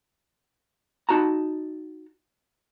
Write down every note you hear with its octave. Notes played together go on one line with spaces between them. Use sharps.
D#4 F#4 A5 A#5